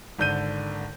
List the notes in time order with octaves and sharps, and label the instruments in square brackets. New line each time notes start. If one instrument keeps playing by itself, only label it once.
[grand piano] G#1 D3 G6 D#7